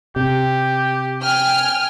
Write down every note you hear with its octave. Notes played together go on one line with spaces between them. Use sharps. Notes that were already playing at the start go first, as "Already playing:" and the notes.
C3 G4
G5 G#5 F6